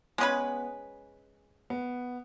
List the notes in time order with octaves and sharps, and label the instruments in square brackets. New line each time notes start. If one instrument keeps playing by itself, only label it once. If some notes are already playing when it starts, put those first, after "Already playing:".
[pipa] G#3 C#4 G#4 B4 [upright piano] B3
[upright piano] B3